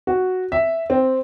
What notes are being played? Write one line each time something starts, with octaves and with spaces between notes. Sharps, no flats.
F#4
E5
C4